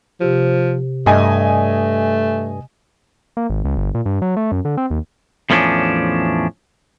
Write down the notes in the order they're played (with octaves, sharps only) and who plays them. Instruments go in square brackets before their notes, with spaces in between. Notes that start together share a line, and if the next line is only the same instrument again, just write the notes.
[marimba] C3 G4 [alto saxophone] F3
[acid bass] G2 [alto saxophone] A3 [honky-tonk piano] D#5 G#5
[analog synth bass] A#3
G#1
C#2
G1
A#2
G2
F#3
A3
F#2
D3
C4
D#2
[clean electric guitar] E2 A2 F3 B3 C#4 D4